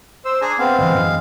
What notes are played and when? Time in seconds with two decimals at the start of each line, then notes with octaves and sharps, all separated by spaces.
0.25 C5 E6
0.42 D4 G#4 G#5 A#5
0.59 B3 C4 F5
0.78 G1 D3 E3 G#3 F5
0.94 F#2 E3 F#3